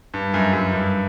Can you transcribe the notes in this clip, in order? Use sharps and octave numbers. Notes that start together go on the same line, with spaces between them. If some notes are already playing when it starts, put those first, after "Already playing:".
G2
F#2
F#2
G2